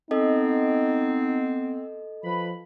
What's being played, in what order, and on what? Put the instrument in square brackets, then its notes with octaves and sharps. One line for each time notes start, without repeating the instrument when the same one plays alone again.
[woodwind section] B3 C4 [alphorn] D#4 [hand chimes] A4 D#5
[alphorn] F3 [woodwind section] B4 B5